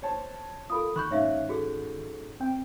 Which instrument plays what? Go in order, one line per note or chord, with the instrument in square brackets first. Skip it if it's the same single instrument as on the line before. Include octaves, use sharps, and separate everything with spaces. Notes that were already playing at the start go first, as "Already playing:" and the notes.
[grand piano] C5 C#5 A5
[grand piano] F4 A#4 [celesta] A4 B5 D#6
[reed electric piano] D#3 [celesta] B5 C#6 G6 [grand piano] F#6
[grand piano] G#2 C#4 [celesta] C#5 E5 F5
[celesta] F#4 G#4 A4
[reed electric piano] C4 G5